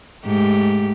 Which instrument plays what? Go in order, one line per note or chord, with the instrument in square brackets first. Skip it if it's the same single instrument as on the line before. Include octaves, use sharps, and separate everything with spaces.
[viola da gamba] G#2 A3 G4